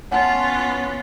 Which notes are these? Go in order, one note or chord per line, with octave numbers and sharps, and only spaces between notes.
B3 C#4 F4 F#5 A5